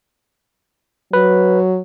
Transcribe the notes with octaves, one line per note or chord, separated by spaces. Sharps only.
F#3 B4